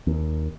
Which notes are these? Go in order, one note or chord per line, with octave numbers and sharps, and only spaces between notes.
D#2